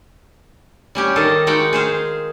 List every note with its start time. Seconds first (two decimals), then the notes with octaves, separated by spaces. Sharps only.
0.95 G3 C#4 G4
1.16 D#3 A4 D#5 F5
1.47 G#3 D#4 F#4 F#5 G5
1.73 G#4 C5 F5